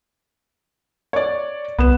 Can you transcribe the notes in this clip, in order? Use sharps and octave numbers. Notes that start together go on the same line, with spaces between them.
C#5 D5
C2 B3 E7